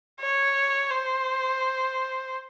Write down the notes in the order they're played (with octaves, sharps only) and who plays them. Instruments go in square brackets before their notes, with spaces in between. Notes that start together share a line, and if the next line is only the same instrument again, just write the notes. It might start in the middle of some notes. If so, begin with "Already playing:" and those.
[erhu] C#5
C5